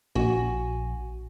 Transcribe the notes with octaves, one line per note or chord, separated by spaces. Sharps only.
A#1 F#4 G#5